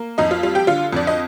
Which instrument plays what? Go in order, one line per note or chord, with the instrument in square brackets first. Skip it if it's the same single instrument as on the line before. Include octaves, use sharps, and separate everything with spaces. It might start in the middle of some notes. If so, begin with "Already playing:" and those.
Already playing: [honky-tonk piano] A#3
F2 D#4 D#5
F4 F5
G3 F4 F5
G4 G5
D3 F4 F5
F2 D5
D#5